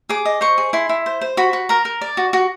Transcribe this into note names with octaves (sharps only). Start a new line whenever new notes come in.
G#4 D6
D#5
C5 C#6
G#4
E4 C6
E4
C5
C5
F#4 B5
F#4
A#4 A#5
A#4
D5
F#4
F#4